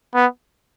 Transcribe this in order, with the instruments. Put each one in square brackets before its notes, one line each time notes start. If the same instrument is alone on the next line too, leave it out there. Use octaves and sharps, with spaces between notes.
[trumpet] B3